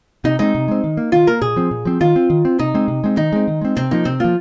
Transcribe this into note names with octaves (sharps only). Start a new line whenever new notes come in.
C3 D#4
G#3 C4 D#4
C3
G#3 C4
D#3
A#3
D#3 F4
A#3 A#4
A#2 G#4
F3 C4
A#2
F3 C4
D#3 F4
C4
D#3
C4
C3 D#4
G#3 C4
C3
G#3 C4
D#3 D#4
G#3 C4
D#3
G#3 C4
C3 C4
F3 A#3 D#4
C3 C4
F3 A#3 F4